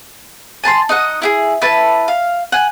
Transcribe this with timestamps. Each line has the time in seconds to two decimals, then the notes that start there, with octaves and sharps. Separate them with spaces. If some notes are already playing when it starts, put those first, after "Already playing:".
0.64 G#5 A5 B5 C6
0.89 D#4 D#5 F#5
1.22 E4 G4 G#4
1.62 E4 B4 A5
2.08 F5
2.52 F#5 G#5